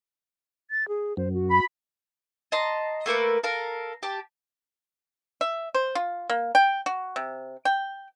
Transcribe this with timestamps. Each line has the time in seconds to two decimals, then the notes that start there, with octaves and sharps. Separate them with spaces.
0.71 A6
0.88 G#4
1.17 F#2 C5
1.34 F#4
1.51 B5
2.52 D#5 A5 A#5 C6
3.06 A3 A#3 A#4 B4
3.43 A4 A#4 F5 A#5
4.03 G4 A5
5.41 E5
5.75 C5
5.95 F4
6.30 A#3
6.55 G5
6.86 F#4
7.16 C3
7.65 G5